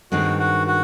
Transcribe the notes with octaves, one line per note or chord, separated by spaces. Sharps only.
G2 D#3 G#3 C4 F#4
F#4
F#4